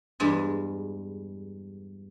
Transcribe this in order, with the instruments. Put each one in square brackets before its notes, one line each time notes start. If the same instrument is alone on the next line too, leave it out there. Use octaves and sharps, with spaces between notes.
[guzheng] E2 G2 G#3